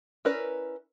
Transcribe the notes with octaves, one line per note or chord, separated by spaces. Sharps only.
C#4 E4 A#4 B4 D5